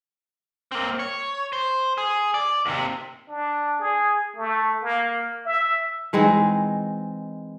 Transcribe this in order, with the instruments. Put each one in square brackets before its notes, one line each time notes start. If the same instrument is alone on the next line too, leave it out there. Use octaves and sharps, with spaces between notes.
[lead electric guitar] A#3 C4
C#5
C5
G#4
D5
D#2 C3
[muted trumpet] D4
G#4
A3
A#3
E5
[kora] E3 G#3 C4 D#4